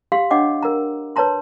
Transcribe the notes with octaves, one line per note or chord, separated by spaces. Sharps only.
G4 F5 C6
D4 C#5 D#5 F#5 G5 D6
A#4 A#5
B4 C#5 A5 A#5 C6